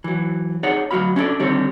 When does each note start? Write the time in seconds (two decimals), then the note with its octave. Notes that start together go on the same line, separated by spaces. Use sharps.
0.04 E3 F#3
0.63 D#4 G#4 C#5 D5 F#5
0.91 D2 F#3 E4 F#4 F5 B5
1.16 C#4 D4 E4 F#4 A4 D5
1.40 D3 D#3 G3 C4 G4 C#5